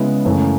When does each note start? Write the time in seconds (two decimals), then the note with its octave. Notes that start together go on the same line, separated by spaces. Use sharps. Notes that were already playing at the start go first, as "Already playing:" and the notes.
Already playing: C#3 G#3 B3 E4
0.25 F#2 C#3 E3 A3